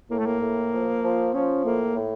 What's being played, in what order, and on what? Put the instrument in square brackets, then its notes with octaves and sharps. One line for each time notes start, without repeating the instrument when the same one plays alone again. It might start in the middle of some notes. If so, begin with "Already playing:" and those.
[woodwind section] A2 [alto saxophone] A#3
[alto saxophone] A3
A#3
[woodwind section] A2
F3
F3
[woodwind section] F3 [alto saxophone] C#4
[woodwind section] A2 [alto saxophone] A#3
[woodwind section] A2